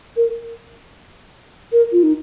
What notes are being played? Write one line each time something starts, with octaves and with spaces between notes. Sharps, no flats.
A#4
A#4
F4
D#4